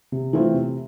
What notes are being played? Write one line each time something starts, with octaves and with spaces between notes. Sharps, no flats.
C3
E3 A3 C4 F4
C3